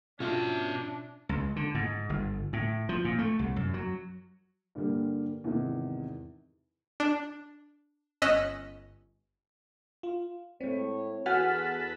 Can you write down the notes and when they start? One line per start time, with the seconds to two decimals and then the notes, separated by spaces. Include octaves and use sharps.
0.20 B2 C#4 D4 F4 E5
1.29 C#2
1.56 D3
1.75 G#2
2.09 G1
2.53 A2
2.89 F3
3.05 A#2
3.19 A3
3.39 C2
3.56 F#2
3.74 F#3
4.75 G2 D3 G3 A#3
5.44 E2 G#2 C3 D#3
7.00 D4
8.22 G1 C#4 D#5 E6 F#6 B6
10.03 F4
10.61 A2 G#3 C4 C#5
11.26 E2 F#4 A4 B4 F#5 G#5 F6